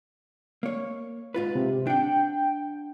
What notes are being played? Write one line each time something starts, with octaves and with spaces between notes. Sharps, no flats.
A#3 C#5
G#2 F4 B4
C3
D4 F#5 G5